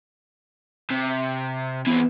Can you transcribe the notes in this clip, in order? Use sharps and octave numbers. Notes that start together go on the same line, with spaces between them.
C3
E3 B3 C4